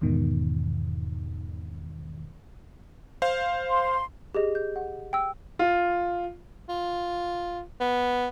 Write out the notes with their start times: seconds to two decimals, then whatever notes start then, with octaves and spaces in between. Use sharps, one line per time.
0.01 E2 G#2 B2 D#3
3.22 C5 F5
3.67 C6
4.34 G4 G#4 D#5
4.55 G6
4.76 F#5
5.13 G5 E6
5.59 F4
6.69 F4
7.80 B3